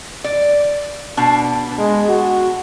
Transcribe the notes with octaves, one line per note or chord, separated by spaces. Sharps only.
D5
B2 D4
G#3
F#4